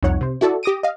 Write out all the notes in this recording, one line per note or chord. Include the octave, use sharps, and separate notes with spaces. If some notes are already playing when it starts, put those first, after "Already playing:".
C2 F2 D#4 C#5 F#5
C3 C5
E4 F#4 A4 D5
G4 D6 D#6 A#6 D7 D#7
D#5 F5